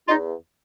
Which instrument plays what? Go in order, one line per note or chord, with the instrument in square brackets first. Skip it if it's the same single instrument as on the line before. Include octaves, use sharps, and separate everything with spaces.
[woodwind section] E2 D#4 F4